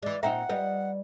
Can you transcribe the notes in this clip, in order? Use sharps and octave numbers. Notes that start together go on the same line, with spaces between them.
E3 G#3 D5
A#2 C4 D#4 E5 F#5 G5 A#5
G3 B4 D#5